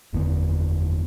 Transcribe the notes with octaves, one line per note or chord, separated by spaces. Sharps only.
F#1 E2 D3 B3